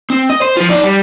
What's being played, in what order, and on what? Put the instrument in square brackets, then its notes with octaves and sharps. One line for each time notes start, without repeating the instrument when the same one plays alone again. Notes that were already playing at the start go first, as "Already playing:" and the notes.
[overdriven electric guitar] C4
D#5
C5
F3 F4
D#4 D5
G3